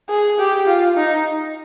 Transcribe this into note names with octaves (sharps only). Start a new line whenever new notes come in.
G#4
G4
F4
D#4